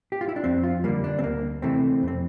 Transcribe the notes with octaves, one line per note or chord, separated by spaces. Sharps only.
G4
F4
E4
D4
F2 C4
F4
D3 G3 A#3
D4
C4
D2 A#3
C3 E3 A3 C4
F2 C4